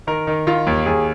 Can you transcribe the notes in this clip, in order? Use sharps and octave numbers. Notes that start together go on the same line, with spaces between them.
D#3 A#4
D#3
D#3 F4
D#2
D#2 G#4